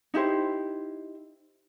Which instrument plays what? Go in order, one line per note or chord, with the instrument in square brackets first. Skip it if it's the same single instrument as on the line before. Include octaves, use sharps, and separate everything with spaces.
[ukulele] D#4 E4 G4 C5